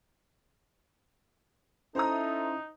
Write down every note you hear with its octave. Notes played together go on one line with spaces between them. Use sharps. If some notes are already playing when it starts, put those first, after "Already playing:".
C#4 D#4 E4 A4 C5 E5 A#5 D#6